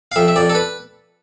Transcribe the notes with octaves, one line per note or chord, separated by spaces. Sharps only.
F5
F2 E5
E5
F2 D5
A4
B4